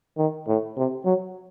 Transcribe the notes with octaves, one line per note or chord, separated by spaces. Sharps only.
D#3
A2
C3
F#3